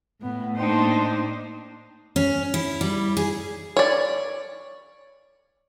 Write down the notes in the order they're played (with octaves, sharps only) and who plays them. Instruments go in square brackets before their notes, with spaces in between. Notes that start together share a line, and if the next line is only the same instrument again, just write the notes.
[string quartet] A2 [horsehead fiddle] B3
[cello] A#3 D#4 [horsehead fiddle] D4 C5 [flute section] G5 A5 C6
[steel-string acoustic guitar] C#4
E4
G3
G#4
[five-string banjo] C#5 D5